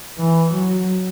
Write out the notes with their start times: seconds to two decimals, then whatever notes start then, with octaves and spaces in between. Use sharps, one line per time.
0.19 E3
0.54 F#3